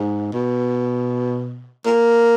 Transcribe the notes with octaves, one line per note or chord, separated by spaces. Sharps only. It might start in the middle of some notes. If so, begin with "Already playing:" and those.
Already playing: G#2
B2
A#3